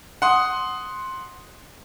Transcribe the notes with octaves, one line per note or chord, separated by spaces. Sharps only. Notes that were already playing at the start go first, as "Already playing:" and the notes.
F#5 C6 D#6